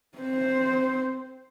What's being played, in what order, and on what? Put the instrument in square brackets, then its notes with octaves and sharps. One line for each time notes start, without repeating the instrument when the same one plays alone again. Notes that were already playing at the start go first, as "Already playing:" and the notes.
[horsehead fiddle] C4 C5